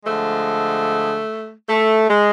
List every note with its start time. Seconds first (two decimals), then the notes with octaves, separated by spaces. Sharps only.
0.05 D3 F3 G#3 A3
1.69 A3
2.09 G#3